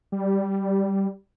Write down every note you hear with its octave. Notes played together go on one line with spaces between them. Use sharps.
G3